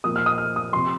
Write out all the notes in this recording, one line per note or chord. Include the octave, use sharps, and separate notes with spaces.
A#2 F3 A#3 D#6
F6
D#6
F6
D#6
C3 F3 C6